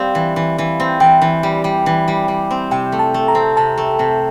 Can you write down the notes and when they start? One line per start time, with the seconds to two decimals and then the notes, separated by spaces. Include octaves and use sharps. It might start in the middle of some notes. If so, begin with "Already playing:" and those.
Already playing: G3 C4 F5
0.15 E3
0.36 E3
0.58 E3
0.80 C4
1.00 E3 G5
1.21 E3
1.43 G3
1.64 G3
1.86 E3
2.08 G3
2.28 G3
2.51 C4
2.71 C3 G5
2.92 A3
2.99 A5
3.14 A3
3.28 A#5
3.35 C4
3.57 C3 A5
3.78 A3
3.99 C3